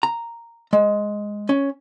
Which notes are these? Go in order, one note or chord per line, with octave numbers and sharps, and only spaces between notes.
A#5
G#3
C#4